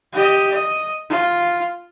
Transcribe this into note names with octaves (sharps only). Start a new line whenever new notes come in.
G4 D#5
D#5
F4